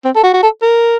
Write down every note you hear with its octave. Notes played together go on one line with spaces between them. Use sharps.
C4
A4
F#4
F#4
A4
A#4